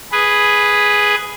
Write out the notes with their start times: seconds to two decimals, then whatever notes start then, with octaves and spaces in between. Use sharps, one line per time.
0.12 G#4 B4